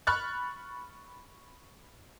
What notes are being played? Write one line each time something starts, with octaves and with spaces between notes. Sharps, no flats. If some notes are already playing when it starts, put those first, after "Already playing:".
B5 C#6 F6 F#6 A6